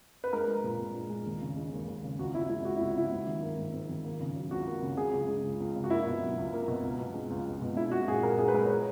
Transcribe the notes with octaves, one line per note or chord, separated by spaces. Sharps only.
B4
G#3 A#4
G#3
A#2
A#2
G#3
G#3
D#2
C#3
G#3
D#2
D#2
C#3
C#2 F#4
C#3 E4
G#3 E4
C#2 F#4
C#2 E4
C#3 E4
G#2
D#3
A#3
G#2
G#2
D#3
A#3
C#3
F#3
C#2 F#4
A#3
C#3
C#2 G#4
C#3
G#3
C#2
C#2
C#3
F#4
A#3 E4
B2
F#3
C#2
A#3
B2
C#2
B2
G#3
C#2
C#2
B2
G#3 E4
G#3 F#4
A#2 G#4
A#2 A#4
G#3 G#4
B4
G#3 A#4
C#5
B4